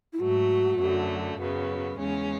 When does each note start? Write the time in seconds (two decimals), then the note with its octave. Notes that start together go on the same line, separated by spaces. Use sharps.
0.13 E4
0.20 G#2 F#3 A3 F#4
0.79 F#2 D3 F#3 A3
1.39 F#2 C#3 F#3 B3
1.98 E2 C#3 G#3 C#4